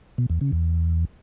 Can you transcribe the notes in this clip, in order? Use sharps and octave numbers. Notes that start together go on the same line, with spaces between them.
B2
E2
C#3
E2